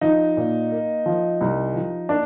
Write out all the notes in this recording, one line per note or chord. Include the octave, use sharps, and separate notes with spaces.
F3 D#4
A#2
A#3
F3
C2
F3
A#3 D4